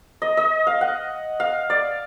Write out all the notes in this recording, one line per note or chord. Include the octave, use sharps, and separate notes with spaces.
D#5
D#5
F5
F#5
F5
D5